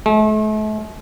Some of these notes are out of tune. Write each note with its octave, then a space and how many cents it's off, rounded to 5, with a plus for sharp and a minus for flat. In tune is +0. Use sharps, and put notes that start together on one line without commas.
A3 -40